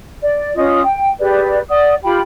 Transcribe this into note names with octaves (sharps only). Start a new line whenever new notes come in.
D5
C#4 F4 D#5 D#6
G5
G4 G#4 B4 D5
D5 F#5 D#6
F4 G4 G5 B5